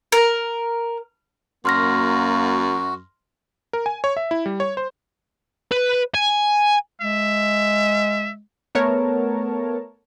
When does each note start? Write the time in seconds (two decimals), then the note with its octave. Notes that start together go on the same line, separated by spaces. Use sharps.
0.12 A#4
1.65 F#2 A#3 F#4 C6 F6 A#6
3.73 A#4
3.86 G#5
4.04 C#5
4.17 E5
4.31 E4
4.46 G3
4.60 C#5
4.77 C5
5.72 B4
6.14 G#5
7.01 G#3 E5
8.75 A3 B3 A#4 C#5 A5